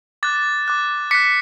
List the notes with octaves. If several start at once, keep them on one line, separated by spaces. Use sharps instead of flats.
D6 F#6 A6
D6 F#6
D6 F#6 B6 C#7